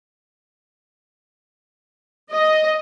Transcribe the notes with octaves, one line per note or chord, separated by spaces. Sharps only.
D#5